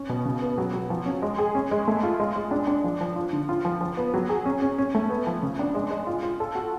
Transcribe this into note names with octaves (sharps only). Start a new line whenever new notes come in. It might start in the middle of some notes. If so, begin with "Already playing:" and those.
Already playing: C#4
B2
C#3
B3
F#3
F#3
F3
C#4
G#3
G#4
C#4
G#3
A3
F4
G#3
G#3
D4
D4
F3
F3
F4
D3
F4
F3
F3
B3
F#3
G#4
C#4
C#4
C#4
A3
B3
F3
C#3
D4
G#3
G#3
F4
F4
A4
F#4